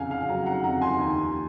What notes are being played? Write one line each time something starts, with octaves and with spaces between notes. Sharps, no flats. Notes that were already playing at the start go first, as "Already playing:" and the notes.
Already playing: F2 C#3 F5 F#5 G#5 A#5
F5 G#5
F#3 F#5 A#5
F#5 A#5
F2 F#5 A#5
G#5 C6
D#2